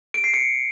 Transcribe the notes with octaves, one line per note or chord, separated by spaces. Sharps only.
D7
C7
C#7